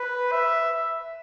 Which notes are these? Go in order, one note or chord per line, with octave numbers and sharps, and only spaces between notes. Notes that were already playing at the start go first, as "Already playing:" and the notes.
Already playing: B4
E5